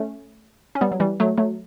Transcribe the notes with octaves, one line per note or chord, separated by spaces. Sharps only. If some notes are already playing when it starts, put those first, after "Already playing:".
Already playing: A3 C#4
C#4
G3 B3
F#3
E3 G3
F#3 A3
F#3 A3